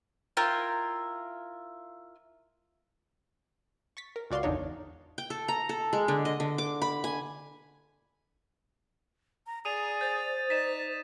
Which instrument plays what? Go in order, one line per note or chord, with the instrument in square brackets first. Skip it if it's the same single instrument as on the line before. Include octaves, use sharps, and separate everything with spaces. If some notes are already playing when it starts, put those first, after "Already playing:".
[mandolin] E4 F4 A#4 G5
[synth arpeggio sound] C#6 A6 B6
A#4
C#2 F#4 D5 F5 C6
G#1 E2 D3 D#4 C#5
[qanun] G5
A4
A#5
A4
G#3
D3
D#5
D3
D6
B5
G#5
[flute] A#5
[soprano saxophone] G#4 [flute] D5 [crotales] D#6 D#7 F7
[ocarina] C5 [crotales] G6 A6
[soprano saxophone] D#4 [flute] D5 [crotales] B6 D#7 E7